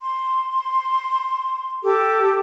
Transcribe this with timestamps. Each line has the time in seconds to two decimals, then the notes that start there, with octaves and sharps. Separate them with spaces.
0.01 C6
1.84 G4 A4 D6